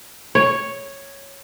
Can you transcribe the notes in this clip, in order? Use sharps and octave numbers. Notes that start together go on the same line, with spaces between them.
C#5